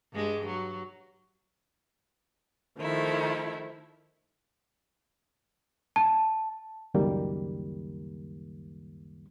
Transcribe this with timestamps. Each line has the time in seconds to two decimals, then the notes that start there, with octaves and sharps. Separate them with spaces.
0.13 G2 G#3
0.46 F#3
2.79 D#3 F3 A3 E4
5.96 A5
6.94 C#2 F#2 D#3 G3 A#3